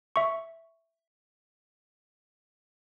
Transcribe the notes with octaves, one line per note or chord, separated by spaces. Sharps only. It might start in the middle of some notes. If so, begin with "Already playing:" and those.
E5 C#6